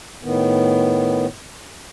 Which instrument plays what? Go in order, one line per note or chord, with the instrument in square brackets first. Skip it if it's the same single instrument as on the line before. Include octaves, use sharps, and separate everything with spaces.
[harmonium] A2 D#3 B3